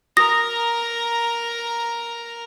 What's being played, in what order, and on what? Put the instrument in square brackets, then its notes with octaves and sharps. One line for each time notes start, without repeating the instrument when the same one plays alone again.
[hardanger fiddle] A#4 A#5 [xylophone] D#6 A#6